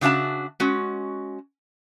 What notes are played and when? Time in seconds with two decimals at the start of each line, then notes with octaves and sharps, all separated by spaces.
0.01 C#3 D4 F#4 E5 A5
0.60 G#3 C#4 F#4